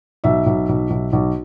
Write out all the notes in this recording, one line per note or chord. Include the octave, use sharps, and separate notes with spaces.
B1 E5
B1
B1
B1
B1